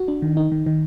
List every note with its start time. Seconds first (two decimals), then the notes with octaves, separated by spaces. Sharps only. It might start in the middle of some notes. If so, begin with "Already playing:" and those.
Already playing: F#4
0.08 D4
0.22 D#3
0.37 D#4
0.52 D#3
0.66 D#3